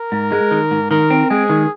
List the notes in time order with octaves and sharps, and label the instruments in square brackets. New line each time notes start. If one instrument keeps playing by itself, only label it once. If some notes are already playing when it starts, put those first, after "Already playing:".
Already playing: [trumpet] A#4
[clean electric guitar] G#2
G#3
D#3
G#2
[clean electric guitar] D#3 [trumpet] A#4
[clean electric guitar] C4
[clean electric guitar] G#3 [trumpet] G#4
[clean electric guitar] D#3